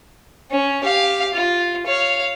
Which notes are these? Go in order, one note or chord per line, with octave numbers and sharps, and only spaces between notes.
C#4
G4 F5
F4
C#5 F5